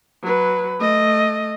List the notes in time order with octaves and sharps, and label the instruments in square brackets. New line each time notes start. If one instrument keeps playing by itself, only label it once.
[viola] F#3 B4
A3 D#5